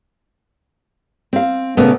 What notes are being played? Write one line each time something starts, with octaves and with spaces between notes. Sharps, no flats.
C4 F5
A#2 C#3 A3 B3